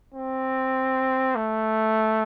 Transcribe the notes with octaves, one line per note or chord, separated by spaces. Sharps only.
C4
A3